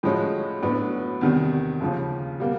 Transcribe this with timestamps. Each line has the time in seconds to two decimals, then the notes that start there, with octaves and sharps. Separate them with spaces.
0.03 A2 F3 G#3 C#4 F#4
0.62 A2 F#3 B3 D4
1.21 E2 C3 D#3 G3
1.80 D#2 C#3 F3
2.40 B2 G3 A#3